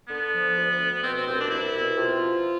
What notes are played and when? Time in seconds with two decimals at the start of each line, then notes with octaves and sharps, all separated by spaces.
0.08 D3 B3
0.33 F3
0.57 D2
0.79 D2
1.04 B2 C4
1.16 C4
1.27 C2 C4
1.40 D4
1.51 C2 E4
1.74 B2
1.98 C3 F4
2.21 F3